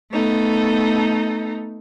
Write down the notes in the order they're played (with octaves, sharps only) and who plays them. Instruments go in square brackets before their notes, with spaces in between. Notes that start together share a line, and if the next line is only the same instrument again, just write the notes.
[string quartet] A3 B3 D#4 A4